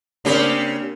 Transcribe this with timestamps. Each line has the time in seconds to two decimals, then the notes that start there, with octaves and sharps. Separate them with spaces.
0.25 C#3 A#3 C4 D4 G4